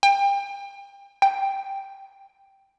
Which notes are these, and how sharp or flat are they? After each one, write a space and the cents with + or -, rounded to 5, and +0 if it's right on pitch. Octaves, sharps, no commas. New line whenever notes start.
G5 +30
G5 +0